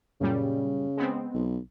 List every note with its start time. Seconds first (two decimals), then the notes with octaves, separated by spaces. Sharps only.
0.21 F#2 A#2 C#3 G3
0.97 G#3 B3 C4
1.34 B1